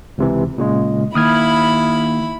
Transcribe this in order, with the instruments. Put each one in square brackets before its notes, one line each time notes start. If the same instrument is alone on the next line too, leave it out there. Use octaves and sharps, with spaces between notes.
[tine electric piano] C#2 C3 E3
A#2 C#3 G#3
[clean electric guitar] D#2 [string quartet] E4 B5 [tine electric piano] D#6 F6 G#6